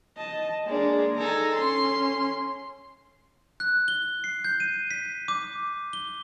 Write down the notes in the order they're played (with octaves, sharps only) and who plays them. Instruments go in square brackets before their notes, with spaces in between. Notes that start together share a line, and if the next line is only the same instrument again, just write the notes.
[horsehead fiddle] D#5 A5
[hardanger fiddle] G#3 D4 [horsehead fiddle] A#3 G#4
[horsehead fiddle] D#4 A#5 [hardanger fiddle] A4 G#5
[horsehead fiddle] C#4 [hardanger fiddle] C6
[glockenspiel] F#6
G7
C7
G6
D#7
B6
D6
G7